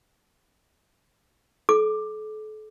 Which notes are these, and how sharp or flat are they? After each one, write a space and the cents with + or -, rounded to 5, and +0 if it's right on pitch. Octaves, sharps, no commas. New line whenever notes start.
A4 -35 D6 +10